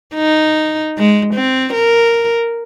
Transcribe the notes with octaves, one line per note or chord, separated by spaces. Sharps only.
D#4
G#3
C4
A#4